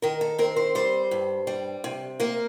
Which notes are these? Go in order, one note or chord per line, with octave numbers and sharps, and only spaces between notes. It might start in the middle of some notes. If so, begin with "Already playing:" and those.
D#3 A#4
A4
C4 A#4
C5
G3 C5
G2
G3
C3
A#3 A#4